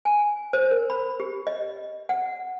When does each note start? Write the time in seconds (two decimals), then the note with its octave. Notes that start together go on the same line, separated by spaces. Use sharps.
0.05 G#5
0.53 C5
0.71 A#4
0.90 B5
1.20 G4
1.47 D#5
2.09 F#5